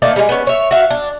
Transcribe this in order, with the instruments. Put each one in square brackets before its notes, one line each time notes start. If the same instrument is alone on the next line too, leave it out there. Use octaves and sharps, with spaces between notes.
[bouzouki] D#3 A3 A#3 D5
G3 G#3
B3 C#4
C#5 E5
F#4 E5 F5
D4